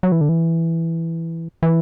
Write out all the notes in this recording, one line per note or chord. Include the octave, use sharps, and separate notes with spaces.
F#3
E3
D3
E3
E3